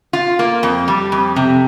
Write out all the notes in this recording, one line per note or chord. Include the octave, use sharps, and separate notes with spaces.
F4
A#3
F2
G3
F2
C3